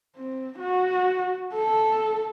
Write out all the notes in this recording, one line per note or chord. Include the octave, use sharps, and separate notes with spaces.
C4
F#4
A4